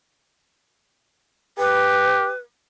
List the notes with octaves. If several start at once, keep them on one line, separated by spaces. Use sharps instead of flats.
G4 B4